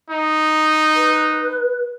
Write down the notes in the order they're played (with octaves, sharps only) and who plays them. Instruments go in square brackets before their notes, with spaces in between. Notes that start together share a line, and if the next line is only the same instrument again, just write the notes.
[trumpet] D#4
[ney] B4